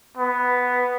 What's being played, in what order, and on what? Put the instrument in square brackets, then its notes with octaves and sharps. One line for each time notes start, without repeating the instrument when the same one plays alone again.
[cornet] B3